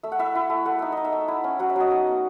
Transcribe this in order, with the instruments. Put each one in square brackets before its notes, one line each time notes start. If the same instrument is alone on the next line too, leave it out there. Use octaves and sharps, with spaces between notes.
[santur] A3 E5
F#5
E4 E5
E4
A3
A3 F#5
D#4 E5
D#4 D#5
E5
A3
E4
C#4
F#3 F#5
E5
F#3 D#5
D#4
B3